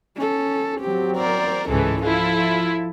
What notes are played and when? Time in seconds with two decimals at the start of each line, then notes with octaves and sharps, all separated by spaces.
0.16 C#4 A4
0.80 F#3 C4 G4
1.17 A#4 C5 D5
1.69 C#2 G#2 E3 G#3 C#4 A4
2.03 F3 E4 F4 A4